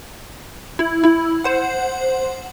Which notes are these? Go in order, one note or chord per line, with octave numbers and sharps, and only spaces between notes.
E4
E4
C5 F#5